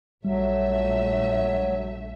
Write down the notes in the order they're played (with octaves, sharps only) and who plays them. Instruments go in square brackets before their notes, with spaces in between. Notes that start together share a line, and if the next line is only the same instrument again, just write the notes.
[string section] A#1 A3 E5 [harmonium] F#3 [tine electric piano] G3